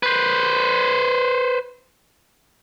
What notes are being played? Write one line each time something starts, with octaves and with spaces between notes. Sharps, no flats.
B4 C5